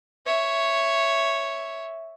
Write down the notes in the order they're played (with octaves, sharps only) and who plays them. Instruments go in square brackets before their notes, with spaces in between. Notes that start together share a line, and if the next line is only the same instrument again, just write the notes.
[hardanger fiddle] C#5 E5